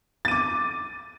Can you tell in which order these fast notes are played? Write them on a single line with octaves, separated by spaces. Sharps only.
A6 D#7 D6